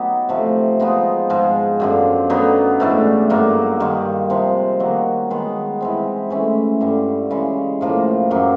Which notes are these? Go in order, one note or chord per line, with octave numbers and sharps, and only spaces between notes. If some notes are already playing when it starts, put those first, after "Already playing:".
Already playing: F#3 B3 D#4 G4
C3 F3 A3
F3 G#3 B3 D#4
G#2 F3 G#3
F#2 D3 F3
D3 F#3 B3 D#4
G#2 E3 A3 D4
G2 D3 F#3 A#3
G2 D#3 G#3
C3 F3 G#3
D#3 F#3 A#3
D#3 G#3 B3
E3 G#3 C4
E3 A3 C#4
G2 D3 G3
C#3 E3 G#3
A2 F3 A#3
F#2 C#3 F#3 A#3